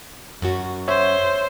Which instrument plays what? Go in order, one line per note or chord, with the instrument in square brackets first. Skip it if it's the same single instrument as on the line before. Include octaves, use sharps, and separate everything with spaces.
[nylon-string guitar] F#2 F#4
[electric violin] C5 [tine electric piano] C#5 E5